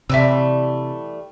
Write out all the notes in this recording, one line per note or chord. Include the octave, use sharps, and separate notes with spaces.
C3 E3 G3 A3 E5 E6